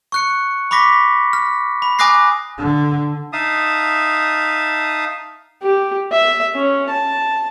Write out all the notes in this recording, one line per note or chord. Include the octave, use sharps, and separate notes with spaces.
C#6 F#6 C#7
B5 C#6 D6 A#6 B6
F6
B5
G#5 D6 D#6 F#6 A#6 C7
D3
D#4 E5 F5 A5 D#6
G4
E5
C#4
A5